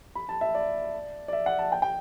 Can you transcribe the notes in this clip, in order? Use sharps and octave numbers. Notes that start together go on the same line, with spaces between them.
B5
A5
E5
D5
D5
E5
F#5
A5
G5
G5